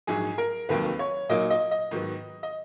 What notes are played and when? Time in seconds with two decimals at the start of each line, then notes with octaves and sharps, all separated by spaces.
0.07 A#1 G#2 F#3 G#4
0.38 A#4
0.69 F1 D#2 D#3 F#3 A#3 B4
0.99 C#5
1.29 A#2 F#3 A#3 D#4 D#5
1.50 D#5
1.71 D#5
1.91 G#2 D#3 F#3 B3
2.43 D#5